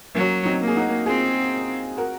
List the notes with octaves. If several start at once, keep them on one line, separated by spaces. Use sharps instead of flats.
F#3 A#3 C#4
C4 D#4
A#3
G#4
D#4 F#4
C4 F4 G#4
F#4 A#4